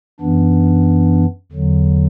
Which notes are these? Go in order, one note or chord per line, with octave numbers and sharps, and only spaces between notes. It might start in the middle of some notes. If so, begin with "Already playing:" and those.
F#2 E3 B3 D4
E2 D3 F#3